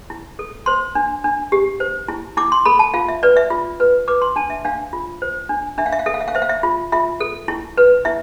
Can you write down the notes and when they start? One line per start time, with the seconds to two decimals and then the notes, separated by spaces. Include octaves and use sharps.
0.10 E4
0.39 A4
0.66 C5 C6
0.95 D4
1.24 D4
1.52 G4
1.80 C5
2.08 E4
2.37 E4 D6
2.52 C6
2.65 A4 B5
2.79 A5
2.94 F4 F5
3.08 E5
3.23 B4 D5
3.37 E5
3.50 F4
3.80 B4
4.08 B4 D6
4.22 C6
4.36 D4 A5
4.50 E5
4.65 D4 F5
4.93 F4
5.22 C5
5.49 D4
5.78 D4 E5
5.86 F5
5.92 E5
5.99 F5
6.06 A4 E5
6.14 F5
6.21 E5
6.28 F5
6.35 C5 E5
6.42 F5
6.49 E5
6.63 F4
6.92 F4 E5
7.20 A4
7.48 E4
7.77 B4
8.05 E4 E5